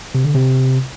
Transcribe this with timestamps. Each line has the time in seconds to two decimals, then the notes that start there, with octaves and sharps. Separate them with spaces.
0.15 C3
0.25 D3
0.34 C3